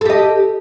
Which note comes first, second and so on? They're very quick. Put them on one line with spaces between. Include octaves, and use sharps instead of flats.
A4 G4 D#5